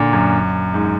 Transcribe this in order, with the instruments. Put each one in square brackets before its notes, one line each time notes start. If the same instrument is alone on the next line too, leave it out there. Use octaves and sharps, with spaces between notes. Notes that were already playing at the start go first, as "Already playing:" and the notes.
Already playing: [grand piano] A#2 D3
F#2
G#2